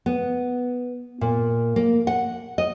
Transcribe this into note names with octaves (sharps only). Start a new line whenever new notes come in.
B3
A#2
A#3
F#5
D#5